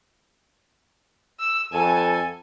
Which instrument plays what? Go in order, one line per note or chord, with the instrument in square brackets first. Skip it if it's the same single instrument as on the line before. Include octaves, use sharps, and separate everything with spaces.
[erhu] E6
[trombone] F2 [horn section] A4 [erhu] G#5